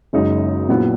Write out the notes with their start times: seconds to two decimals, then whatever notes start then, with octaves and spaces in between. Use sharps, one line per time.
0.13 F#1 F#2 C#3 G#3 D#4
0.69 A#1 A#2 F#3 B3 E4